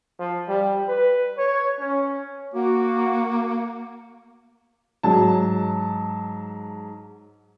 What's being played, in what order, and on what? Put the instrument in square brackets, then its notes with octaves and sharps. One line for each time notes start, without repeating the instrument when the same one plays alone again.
[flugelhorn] F3
G3
B4
C#5
C#4
[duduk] A#3 [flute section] F#4 F#5 D6
[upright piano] G#2 F#3 A5